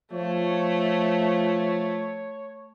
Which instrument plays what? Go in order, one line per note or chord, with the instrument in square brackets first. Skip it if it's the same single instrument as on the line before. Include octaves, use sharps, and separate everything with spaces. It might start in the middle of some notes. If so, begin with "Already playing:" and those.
[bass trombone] F3 [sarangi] A3 [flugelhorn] C#5